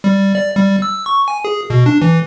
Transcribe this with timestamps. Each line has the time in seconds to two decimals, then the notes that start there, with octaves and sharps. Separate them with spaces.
0.04 G3
0.35 D5
0.56 G3
0.82 E6
1.06 C#6
1.28 G#5
1.45 G#4
1.70 B2
1.86 D4
2.02 E3